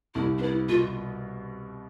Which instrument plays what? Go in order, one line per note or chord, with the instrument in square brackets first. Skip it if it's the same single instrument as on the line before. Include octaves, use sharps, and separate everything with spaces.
[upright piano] C2 [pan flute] E4
[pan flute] D4
[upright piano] B3 [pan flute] E4
[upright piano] B2 [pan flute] F4